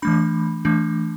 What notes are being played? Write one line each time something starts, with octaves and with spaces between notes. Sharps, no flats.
E3 A3 D4 B5
E3 A3 D4